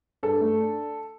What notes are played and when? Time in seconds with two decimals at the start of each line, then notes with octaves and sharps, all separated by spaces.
0.23 G2 A4
0.41 A3
0.58 D4